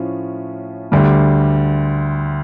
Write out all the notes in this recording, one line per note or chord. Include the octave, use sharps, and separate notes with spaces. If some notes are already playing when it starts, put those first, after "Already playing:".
Already playing: A2 F3 C#4 F4
D2 D3 G3